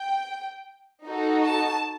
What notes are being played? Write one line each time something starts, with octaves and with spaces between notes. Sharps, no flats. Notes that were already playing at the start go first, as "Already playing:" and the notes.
Already playing: G5
D#4 F#4 A4
A5